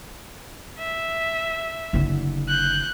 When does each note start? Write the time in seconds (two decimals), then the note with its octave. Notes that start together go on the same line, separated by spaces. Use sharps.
0.79 E5
1.93 F#1 D3
2.49 F#6 G6